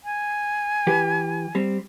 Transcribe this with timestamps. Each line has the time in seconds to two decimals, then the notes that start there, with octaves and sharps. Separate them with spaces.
0.04 G#5
0.87 E3 G4 B4
1.55 G3 C4